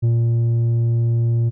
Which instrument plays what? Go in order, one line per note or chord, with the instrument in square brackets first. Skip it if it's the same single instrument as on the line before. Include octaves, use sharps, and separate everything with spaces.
[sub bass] A#2